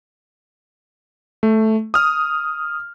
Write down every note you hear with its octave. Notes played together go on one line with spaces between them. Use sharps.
A3
D#6 F6